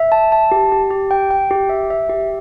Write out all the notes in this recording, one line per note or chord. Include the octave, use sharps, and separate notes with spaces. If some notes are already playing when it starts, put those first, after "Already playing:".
Already playing: E5
A5
A5
G4
G4
G4
G5
G5
G4
E5
E5
G4